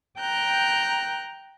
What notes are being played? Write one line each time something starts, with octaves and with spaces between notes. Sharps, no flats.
G5 A#5 F#6 G6